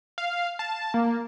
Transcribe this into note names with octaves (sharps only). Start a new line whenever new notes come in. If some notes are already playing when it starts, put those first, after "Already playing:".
F5
A5
A#3